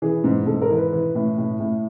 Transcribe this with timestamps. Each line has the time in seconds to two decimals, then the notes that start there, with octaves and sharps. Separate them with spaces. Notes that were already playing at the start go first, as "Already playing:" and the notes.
0.02 E3 G#4
0.24 G#2
0.46 G#2 A4
0.62 A#4
0.70 E3
0.77 B4
0.93 E3
1.15 A2
1.38 A2
1.60 A2